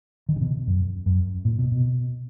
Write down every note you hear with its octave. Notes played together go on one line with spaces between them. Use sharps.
D#3
C#3
B2
F#2
F#2
A#2
B2
B2